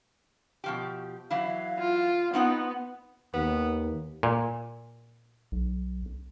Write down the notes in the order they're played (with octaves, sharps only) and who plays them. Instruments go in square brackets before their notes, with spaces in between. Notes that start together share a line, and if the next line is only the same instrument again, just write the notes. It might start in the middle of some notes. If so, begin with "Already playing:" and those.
[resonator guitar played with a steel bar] B2 F3 G4
[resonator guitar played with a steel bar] E3 F#3 E4 [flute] F5
[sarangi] F4
[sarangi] B3 [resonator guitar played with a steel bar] C4 D#4 F#5
[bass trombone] D#2 [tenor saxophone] B3
[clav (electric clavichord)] A#2
[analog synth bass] B1